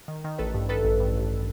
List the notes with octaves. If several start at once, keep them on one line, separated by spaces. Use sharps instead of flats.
D#3
D#3
A1 A4 B4
G2
D#3 A4 B4
A1
G2
A1